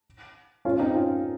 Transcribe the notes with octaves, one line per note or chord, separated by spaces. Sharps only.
C#4 F4
C4 D#4
C#4 F4